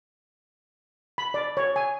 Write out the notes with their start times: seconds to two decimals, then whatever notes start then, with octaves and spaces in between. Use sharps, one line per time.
1.18 B5
1.34 D5
1.57 C#5
1.76 G#5